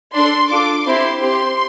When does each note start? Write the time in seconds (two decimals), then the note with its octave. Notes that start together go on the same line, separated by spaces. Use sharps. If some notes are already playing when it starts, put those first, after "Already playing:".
0.14 D4 A4 C6
0.50 D4 F4 A4 D6
0.86 C4 E4 G4 C6
1.21 C4 G4 C6